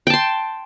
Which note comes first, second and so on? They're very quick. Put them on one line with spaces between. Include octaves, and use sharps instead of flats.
G5 A5 C6